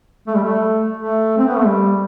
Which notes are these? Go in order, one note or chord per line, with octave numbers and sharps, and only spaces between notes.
A3
G3
A3
A3
C4
B3
A3
G3